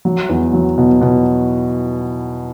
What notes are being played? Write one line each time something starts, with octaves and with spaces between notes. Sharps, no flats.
F#3
E2
F#3
B2
B2